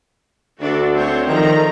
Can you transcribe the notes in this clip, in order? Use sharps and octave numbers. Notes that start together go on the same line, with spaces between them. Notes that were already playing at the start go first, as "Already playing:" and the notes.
D2 D4 F#4 A4
C4 C5 C#5
D#3 F3 A4 A#5